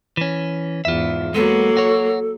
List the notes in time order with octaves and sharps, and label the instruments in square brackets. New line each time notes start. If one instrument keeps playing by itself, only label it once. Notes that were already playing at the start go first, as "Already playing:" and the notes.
[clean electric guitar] E3 C#4
[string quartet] E2 G#2 [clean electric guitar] F4 E5
[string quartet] F#3 A#3 [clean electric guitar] G#3 B3 [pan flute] A4
[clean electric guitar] F#4 C#5